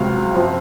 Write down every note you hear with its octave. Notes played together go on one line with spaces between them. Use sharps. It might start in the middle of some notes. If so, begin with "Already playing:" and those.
Already playing: C#2 C3 F#3 F5
F#2 F3 C4